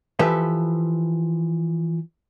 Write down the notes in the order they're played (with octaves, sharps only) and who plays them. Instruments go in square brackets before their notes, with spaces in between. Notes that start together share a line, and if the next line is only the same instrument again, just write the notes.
[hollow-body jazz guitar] E3 F3 G4 A4 B4 E5